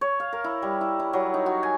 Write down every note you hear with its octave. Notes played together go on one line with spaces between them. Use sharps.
C#5
F5
A#4
E4
G3
E4
E4
F#3
D#4
F#4
G#5